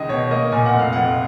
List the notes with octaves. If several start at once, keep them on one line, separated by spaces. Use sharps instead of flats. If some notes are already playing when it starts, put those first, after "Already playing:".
Already playing: C#2 D#3 D#5
B2 C#5
A#3 D#5
A#2 G#5
F#5
F1
F5
F2 F#5